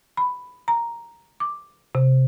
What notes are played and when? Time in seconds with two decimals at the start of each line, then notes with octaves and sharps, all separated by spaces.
0.17 B5
0.68 A#5
1.40 D6
1.95 C3